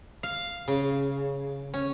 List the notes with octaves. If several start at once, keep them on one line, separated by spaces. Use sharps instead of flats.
F5
C#3
C#4